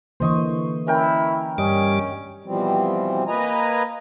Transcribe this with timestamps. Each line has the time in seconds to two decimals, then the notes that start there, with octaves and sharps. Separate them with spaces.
0.20 D3 E3 A#3 C5 D#5 C#6
0.87 C#4 E4 A#4 G5
1.58 G2 G3 C#4 D#5 D6
2.45 B2 E3 F3 G3 C4
3.27 A#3 B4 D#5 G#5 A#5